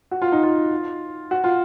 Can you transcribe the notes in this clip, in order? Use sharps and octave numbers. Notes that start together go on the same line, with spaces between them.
F#4
F4
D#4
F4
F#4
F4